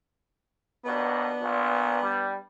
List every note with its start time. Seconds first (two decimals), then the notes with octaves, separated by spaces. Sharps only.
0.86 D#2 B2 B3 D4 B4
1.42 A#1 A#2
2.02 G3